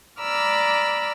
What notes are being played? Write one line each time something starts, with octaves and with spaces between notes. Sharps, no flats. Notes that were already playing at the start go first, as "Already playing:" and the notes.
D5 A#5 B5 D6 E6 F6